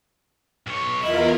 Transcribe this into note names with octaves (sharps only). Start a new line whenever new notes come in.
B1 C#5
E2 E4 F4 A#4 D#5